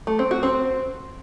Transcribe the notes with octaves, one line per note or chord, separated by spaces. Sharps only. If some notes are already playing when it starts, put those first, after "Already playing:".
A3
C4
F#4
C4